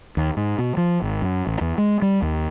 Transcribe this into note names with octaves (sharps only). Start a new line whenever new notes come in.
D#2
G#2
B2
F3
G#1
F#2
A1
E2
G#3
G3
D#2